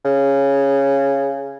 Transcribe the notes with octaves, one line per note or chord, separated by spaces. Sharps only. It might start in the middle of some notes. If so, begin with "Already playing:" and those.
C#3